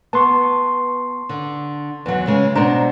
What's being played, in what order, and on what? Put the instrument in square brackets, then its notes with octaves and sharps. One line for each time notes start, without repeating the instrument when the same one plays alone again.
[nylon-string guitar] B3 [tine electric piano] A5 C6 C#6
[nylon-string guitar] D3
E2 F#3
C#3 G#3
[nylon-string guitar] B2 C4 D4 [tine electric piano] C5 A#5